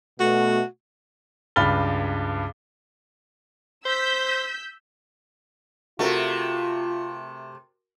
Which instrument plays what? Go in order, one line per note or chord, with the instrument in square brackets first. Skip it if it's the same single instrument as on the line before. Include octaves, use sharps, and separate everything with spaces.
[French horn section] B2 A3 [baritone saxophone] F#4
[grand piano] C#2 G2 B5 F6 A6 G7
[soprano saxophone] C5 [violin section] E6 G6 B6
[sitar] C3 A3 [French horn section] F4 [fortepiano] F#4 A#4